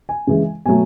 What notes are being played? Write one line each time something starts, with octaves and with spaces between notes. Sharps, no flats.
G#5
C#3 E3 G#3
B2 F#3 A3 G#5